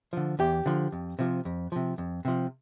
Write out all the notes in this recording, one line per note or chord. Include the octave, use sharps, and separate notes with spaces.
D3 F3
E2 G4
D3 F3
F2
C3 F3
F2
C3 F3
F2
C3 F3